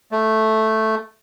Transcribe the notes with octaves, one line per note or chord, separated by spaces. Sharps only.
A3